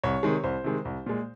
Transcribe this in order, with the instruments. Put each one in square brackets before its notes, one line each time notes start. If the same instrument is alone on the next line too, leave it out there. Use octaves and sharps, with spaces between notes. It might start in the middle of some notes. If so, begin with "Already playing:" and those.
[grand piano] C2 C#5
C3 D#3 G#3
C2 C5
C3 D#3 G#3
C2
A#2 G#3